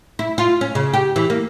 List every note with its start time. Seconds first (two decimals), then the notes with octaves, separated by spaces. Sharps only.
0.19 E4
0.38 F4
0.61 C#4
0.75 C#3
0.93 G4
1.16 E3
1.30 A#3